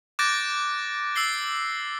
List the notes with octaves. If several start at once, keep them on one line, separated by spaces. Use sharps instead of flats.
D6 F#6 G6 A6 A#6 D7
E6 A6 C7 G7